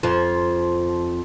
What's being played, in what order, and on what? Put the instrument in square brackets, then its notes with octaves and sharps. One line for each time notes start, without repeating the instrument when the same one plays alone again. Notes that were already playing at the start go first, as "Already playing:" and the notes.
[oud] F2 F3